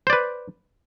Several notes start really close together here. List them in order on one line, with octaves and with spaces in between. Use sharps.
C5 D5 B4